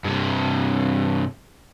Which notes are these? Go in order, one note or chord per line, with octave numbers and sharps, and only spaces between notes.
G2 C3